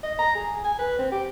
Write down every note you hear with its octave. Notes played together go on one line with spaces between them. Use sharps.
D#5
A#5
G#4
G#5
B4
C4
G4